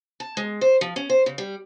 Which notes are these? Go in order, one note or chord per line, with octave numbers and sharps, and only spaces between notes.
A5
G#3
C5
F3
C#4
C5
C#3
G3